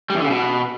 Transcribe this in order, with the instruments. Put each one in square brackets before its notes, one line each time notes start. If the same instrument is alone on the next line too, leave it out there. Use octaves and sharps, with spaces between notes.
[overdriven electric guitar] G3
E2
D3
C#3
B2